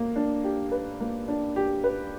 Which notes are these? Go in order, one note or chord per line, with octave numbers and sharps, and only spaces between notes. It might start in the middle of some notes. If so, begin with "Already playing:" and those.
Already playing: A#3
D4
G4
B4
A#3
D4
G4
B4